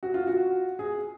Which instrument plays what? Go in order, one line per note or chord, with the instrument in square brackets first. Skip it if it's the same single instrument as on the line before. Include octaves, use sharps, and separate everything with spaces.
[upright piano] F#4
F4
F#4
G#4